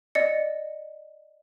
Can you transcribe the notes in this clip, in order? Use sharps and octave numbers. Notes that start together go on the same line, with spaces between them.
D5 D#5 C#7